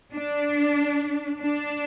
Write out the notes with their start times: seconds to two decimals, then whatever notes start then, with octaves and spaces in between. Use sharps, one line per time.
0.14 D4
1.40 D4